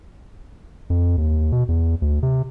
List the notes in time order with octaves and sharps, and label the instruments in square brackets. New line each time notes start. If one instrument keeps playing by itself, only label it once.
[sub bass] F2
D#2
B2
E2
D2
C3